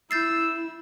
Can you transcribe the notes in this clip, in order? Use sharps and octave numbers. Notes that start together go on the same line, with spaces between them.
E4 E6 G6 A6 C7